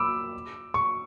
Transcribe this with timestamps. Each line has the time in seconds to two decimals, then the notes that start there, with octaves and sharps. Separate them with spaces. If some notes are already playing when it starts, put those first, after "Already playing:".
Already playing: B5 D6 E6
0.74 C#6